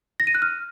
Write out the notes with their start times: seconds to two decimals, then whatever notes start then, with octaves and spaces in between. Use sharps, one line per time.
0.20 A#6
0.27 D#7
0.35 F#6
0.42 F6